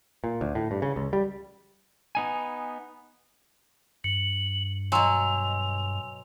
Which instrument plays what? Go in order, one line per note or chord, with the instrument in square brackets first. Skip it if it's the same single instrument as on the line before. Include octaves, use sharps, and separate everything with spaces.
[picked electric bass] A#2
D2
A2
G2
C#3
C#2
G3
[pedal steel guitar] B3 D#4 G#5
[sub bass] G2 [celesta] C#7 [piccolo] F#7
[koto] B2 F#3 [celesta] G#5 C6 E6 [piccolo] F7